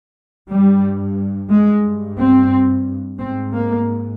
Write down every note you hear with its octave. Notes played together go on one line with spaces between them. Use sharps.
G2 G3
G#3
G2
C4
G#2 C4
A#3